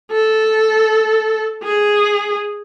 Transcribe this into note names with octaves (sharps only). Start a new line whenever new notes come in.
A4
G#4